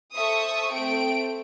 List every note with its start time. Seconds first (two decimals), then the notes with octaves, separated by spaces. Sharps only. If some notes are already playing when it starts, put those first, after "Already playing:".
0.15 A4 C5 E5 C#6 D#6
0.73 A3 C4 G5 D7